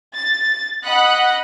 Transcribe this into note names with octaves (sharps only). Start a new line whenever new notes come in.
A6
D#5 F#5 B5 F#6